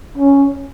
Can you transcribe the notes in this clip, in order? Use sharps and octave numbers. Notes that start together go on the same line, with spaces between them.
C#4